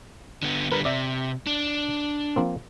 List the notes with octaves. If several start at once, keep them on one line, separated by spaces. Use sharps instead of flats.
D3 B3
D3 G3 A#4 B4
C3 D5 E5
D4
F3 A#3 C4